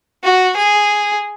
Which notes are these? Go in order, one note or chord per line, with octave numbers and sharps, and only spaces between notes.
F#4
G#4